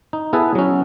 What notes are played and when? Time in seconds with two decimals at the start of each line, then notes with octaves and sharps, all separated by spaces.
0.13 D#4
0.33 B3 E4 G#4 A4 B4
0.55 F#3 C#4